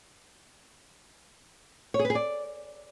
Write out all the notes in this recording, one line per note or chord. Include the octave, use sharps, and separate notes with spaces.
C#5
G#4
B4
G#4
D5